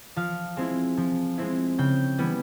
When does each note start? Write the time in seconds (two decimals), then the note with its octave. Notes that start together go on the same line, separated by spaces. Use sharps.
0.16 F3 F5
0.57 G#3 C4 E4
0.97 F3
1.38 G#3 C4 E4
1.78 C#3 G5
2.18 E3 G3 B3 E4